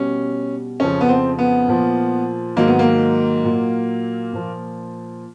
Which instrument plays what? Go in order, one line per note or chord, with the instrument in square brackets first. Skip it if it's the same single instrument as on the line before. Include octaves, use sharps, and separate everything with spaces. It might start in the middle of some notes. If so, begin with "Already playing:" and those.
Already playing: [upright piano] B2 G3 C#4
F2 C#3 F3 C#4
B3
C4
B3
A#2 F3
G#2 D#3 F#3 A#3
B3
A#3
A#2 F#3
A#2 F3